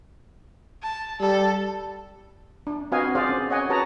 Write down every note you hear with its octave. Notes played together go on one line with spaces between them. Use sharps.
A5
G3 A4
D4
C4 F#4 B4 D#5 F5 G#5
G#4 C5 D5 D#5 F5
C#4
C#5 D#5 F#5 G#5
F#4 G#4 B4 C#5 A5 A#5